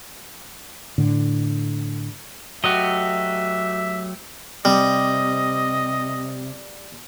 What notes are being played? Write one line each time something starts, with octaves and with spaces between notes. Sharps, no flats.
A2 D3
F#3 A3 F#4 G4 D#5 E5
C3 G3 D#5